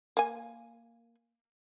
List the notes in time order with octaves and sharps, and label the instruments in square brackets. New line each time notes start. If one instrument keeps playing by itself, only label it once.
[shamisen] A#3 G#5